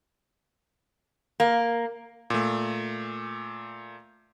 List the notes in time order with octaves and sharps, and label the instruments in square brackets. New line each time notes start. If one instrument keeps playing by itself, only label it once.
[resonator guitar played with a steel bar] A#3
[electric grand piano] A#2 A3